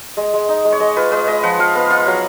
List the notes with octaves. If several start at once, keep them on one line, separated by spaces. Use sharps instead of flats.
G#3
G#3
D#4
G#3
C#5
G#3 D#5
F4 B4
G#3 B4
G#3 D#5
F3 F#5
F3 F5
B3 F5
F4 F5
F#3 F#5